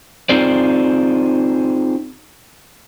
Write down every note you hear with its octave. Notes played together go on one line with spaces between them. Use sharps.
C4 D#4 F4 G#4 C5 D5